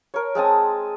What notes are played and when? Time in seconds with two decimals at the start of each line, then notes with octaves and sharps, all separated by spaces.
0.14 A#4 C#5
0.35 G#3 C4 A5 D#6